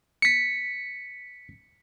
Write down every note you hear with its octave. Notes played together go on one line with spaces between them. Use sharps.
B6 C#7